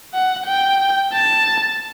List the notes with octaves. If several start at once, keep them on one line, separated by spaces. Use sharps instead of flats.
F#5
G5
A5